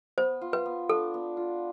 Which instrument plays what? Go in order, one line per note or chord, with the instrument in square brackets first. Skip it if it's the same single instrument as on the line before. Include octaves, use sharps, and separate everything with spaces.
[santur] B3 [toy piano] C5
[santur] F4
[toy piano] B4
[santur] B3
[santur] D4 [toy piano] A4
[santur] B3
F4